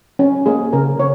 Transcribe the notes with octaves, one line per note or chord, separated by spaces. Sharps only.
C#4
A#3 G#4
C#3 A#4
C#3 C#5